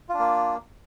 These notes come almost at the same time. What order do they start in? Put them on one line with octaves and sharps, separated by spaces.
F4 D4 A#3